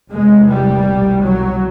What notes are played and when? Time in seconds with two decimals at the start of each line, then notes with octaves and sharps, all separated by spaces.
0.11 F1 E2 C3 G#3
0.48 G3
0.86 C2 B2
1.24 F#3